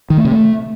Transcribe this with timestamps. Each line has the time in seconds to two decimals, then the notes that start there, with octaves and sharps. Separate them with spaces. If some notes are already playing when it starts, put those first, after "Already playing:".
0.10 D#3
0.17 A3
0.25 C3
0.32 A3